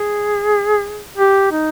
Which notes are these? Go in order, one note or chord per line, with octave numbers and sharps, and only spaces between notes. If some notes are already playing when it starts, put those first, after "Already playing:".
Already playing: G#4
G4
D#4